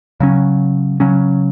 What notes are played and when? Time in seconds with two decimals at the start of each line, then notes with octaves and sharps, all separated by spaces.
0.20 C#3 F#3 C#4
1.00 C#3 F#3 C#4